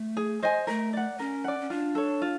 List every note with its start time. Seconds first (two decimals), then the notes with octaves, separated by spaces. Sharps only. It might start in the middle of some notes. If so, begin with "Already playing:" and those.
Already playing: A3
0.17 G#4
0.42 C5 D#5 G#5
0.67 A3 A#4
0.93 D5 F#5
1.19 C#4 A#4
1.44 D5 F#5
1.61 C#4
1.70 D4 F4
1.95 A4 C#5
2.22 F4